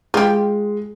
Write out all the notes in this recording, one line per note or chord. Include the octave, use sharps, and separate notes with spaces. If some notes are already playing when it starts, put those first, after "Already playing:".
G#3 F4 G4